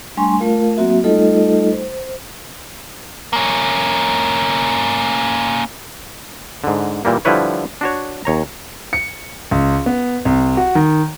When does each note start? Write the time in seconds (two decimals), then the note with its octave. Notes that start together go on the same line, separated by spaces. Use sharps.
0.17 G3 A3 D4 G#5 C6 C#6
0.40 A3 F4 A#4 F5
0.77 F#3 A#3 C4 F#4 E5
1.04 G3 A3 D#4 F4 A4 D#5
1.73 C5
3.33 A#3 C#4
6.64 G#2 D3
7.05 A#2 E3 G3 A#3
7.25 D3 F3 G3 E4 B4 C#5
7.81 D4 F#4 C#5
8.25 D#2 C#5 A#5
8.93 C#7
9.51 C#2
9.86 B3
10.25 C2
10.57 F#4
10.75 D#3